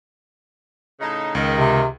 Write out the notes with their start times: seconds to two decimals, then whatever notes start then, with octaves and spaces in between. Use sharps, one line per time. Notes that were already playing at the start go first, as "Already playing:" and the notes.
1.01 A2 C#3 D#4
1.35 C#2 D#3
1.58 C3